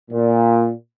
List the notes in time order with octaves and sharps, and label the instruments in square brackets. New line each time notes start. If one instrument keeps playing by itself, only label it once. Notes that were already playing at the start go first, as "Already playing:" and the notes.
[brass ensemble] A#2